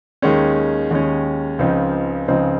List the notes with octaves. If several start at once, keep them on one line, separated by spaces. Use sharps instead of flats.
D#2 D#3 G#3 C#4
D#2 D#3 G#3 C#4
C#2 C#3 F3 C4 D#4
C#2 C#3 F3 C4 D#4